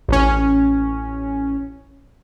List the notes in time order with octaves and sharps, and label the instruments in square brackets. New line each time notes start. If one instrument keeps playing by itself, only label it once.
[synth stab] A1 C#4